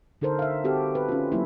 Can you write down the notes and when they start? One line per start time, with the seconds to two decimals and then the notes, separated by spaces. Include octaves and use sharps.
0.21 D3 D#4 A4 A#4 C5
0.39 E5 F5
0.64 C4 F#4 G4 A4
0.95 B4
1.09 C#4 F4
1.32 F#3 A#3 E4